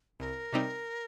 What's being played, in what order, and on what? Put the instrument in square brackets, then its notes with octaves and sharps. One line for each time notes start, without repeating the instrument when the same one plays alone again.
[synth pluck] C2 [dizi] A#4
[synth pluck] C3 G3 C4 D#4